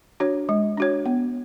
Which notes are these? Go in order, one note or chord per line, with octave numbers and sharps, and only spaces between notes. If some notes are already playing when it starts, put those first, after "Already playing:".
D4 F#4 C#5
G#3
D4 F#4 C#5
B3